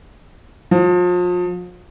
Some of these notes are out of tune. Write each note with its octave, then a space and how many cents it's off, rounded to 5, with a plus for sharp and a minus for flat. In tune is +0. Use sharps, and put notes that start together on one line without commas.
F3 +35